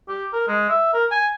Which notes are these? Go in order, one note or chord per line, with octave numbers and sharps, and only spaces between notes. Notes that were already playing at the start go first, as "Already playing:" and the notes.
G4
A#4
G#3
E5
A#4
G#5